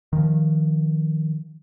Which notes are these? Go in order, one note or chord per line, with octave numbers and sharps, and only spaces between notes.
D#3 F3